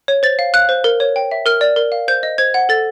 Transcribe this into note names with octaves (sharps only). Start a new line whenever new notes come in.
C#5
C5 A6
F5
F5 F#6
C5
A#4
C#5
G5
E5
A#4 F6
D5
A#4
F5
C5 G6
D#5
C5 G#6
F#5
A4 A6